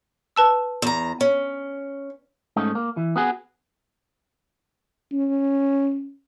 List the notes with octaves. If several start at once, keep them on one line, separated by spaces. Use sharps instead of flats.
B4 A5 E6
E2 A#5
C#4
G#2 A3 C#4 D#4
A#3
E3
B3 F#4 G#4
C#4